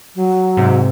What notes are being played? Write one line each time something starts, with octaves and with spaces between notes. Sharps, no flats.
F#3
G#2 C3